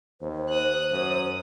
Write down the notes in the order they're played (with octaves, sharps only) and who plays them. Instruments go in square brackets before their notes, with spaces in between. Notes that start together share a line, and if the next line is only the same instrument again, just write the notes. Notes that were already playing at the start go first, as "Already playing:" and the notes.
[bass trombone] D#2 [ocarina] C5
[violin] D#6 F#6
[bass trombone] F#2 [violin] D#6